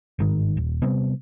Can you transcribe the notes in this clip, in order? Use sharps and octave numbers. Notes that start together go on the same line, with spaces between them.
G1 G#2 D#3
D#1
C3 G3 B3 C4